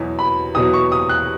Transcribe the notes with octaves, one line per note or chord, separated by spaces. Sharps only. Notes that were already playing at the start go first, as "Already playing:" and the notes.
Already playing: E2 B2 F#3
B5
E2 B2 F#3 D#6
C#6
D#6
F#6